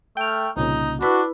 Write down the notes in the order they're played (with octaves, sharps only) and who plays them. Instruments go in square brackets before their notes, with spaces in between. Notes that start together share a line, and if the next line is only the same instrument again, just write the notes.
[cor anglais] A3 [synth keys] G5 F6
[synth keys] C2 A#2 C#3 [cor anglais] D#4
[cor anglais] D4 [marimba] E4 B4 B5 [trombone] F#4